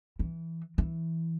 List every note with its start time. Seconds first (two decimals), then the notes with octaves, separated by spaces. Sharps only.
0.19 E3
0.78 E3